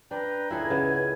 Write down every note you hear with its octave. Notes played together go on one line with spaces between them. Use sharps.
D4 B4 G5 A#5
C#2 E4 G#4 A4 G#5
C#3 B3